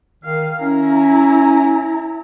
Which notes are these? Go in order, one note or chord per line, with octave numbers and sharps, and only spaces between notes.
D#3 F5
C#4 E4 A#5